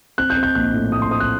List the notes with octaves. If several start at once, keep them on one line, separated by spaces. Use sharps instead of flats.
C4 F#6
G6
C4
G6
A#1 F#6
A2
A2 D#6
C6
C4 D#6
F#6